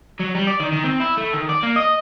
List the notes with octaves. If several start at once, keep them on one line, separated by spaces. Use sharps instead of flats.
F#3
G3
D5
D#3
D#3
C4
E4
A3
D#3
D5
A#3
D#5